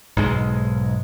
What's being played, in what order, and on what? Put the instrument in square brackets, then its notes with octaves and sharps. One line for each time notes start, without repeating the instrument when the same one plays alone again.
[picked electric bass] B1 G#2 G#3